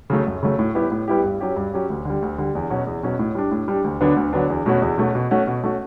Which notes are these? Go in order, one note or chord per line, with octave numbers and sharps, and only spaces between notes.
C#3 F#3 A3
F#2
C#3 F#3 A3
A2
G3 B3 E4 G4
A2
G3 B3 E4 G4
G2
F#3 C#4 G4
G2
F#3 C#4 G4
D2
D3 G3
D2
D3 G3
E2
B2 F#3 C#4 F#4
E2
B2 F#3 C#4 F#4
A2
G3 D4
A2
G3 D4
D2
D3 F#3 B3 D4
D2
D3 F#3 B3 D4
E2
B2 A3 C#4 F#4
E2
B2 A3 C#4 F#4
B2
A3 C#4 F#4
B2
A3 C#4 F#4